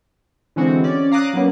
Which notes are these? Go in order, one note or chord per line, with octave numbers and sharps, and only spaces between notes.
D3 E3 G#3 C4 F#4
C#4 D5
F5 A#5 D6 D#6 F#6
F#3 A#3 B3 C#4